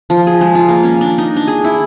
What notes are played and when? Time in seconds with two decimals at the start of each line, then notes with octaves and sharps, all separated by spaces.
0.10 F3
0.27 G#4
0.41 G#3
0.55 F4
0.69 A#3
0.83 C#4
1.01 D4
1.18 D#4
1.36 D4
1.48 G#4
1.64 E4